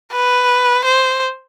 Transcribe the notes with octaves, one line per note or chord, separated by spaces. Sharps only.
B4
C5